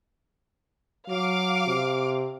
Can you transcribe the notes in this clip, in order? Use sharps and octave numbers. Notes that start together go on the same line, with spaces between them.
F#3 F5 D6
C3